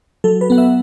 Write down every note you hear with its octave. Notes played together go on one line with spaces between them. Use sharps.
F#3 A4
B4
B3 F#5
E5